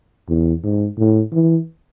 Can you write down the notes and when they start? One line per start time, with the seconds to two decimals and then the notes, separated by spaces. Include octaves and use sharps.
0.29 E2
0.64 G#2
0.98 A2
1.33 E3